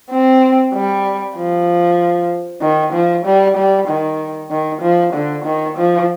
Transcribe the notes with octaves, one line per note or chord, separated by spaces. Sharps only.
C4
G3
F3
D#3
F3
G3
G3
D#3
D#3
F3
D3
D#3
F3